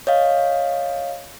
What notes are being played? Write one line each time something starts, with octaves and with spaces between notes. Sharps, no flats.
C#5 D#5 F5